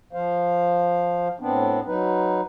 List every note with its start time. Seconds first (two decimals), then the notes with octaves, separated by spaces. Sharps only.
0.13 F3 C5 F5
1.40 A2 B3 C4 D4
1.86 F#3 D#4 B4